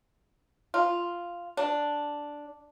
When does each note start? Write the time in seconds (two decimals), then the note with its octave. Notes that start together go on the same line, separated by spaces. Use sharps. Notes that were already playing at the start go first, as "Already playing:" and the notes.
0.74 F4
1.57 D4